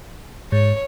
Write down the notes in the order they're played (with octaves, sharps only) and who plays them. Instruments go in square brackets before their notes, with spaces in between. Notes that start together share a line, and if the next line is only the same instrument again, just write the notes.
[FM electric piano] G#2 [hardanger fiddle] C#5